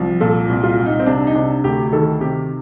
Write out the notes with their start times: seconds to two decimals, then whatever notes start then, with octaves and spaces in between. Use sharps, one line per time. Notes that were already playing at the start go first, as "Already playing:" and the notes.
Already playing: C2 F3
0.21 A#2 A4
0.49 C2
0.63 F4
0.79 C2
0.86 D#4
1.00 C4
1.06 C3 D4
1.27 D#4
1.35 C3 D4
1.64 D2 G4
1.92 D#3 A4
2.21 C3 G4